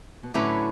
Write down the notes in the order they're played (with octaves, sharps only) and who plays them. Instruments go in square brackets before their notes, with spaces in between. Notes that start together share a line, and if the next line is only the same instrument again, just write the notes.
[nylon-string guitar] B2
[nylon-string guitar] A2 [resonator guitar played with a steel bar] D3 F#3 C#4 E4 B4